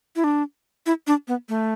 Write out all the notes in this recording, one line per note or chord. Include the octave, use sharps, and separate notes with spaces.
E4
D4
E4
D4
B3
A3